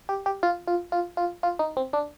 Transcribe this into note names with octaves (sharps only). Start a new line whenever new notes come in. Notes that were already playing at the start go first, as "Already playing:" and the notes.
G4
G4
F4
F4
F4
F4
F4
D#4
C4
D4